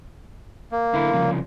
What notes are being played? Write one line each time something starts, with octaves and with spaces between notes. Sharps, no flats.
A#3
D3 E4
C2 C#3 F3